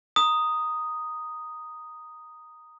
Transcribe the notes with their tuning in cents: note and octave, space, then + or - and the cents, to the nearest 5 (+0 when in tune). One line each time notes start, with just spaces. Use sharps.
A#5 +0 D#6 +0